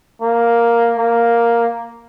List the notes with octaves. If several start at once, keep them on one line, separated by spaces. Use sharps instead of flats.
A#3
A#3